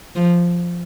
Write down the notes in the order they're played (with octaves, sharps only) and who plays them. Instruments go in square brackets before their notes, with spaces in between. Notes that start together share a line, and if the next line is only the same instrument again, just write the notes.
[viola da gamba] F3